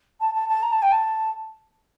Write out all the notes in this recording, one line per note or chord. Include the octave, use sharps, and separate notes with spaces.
A5
A5
A5
A#5
A5
G5
A5